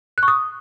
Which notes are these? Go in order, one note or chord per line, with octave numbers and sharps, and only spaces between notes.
F#6
C#6
D#6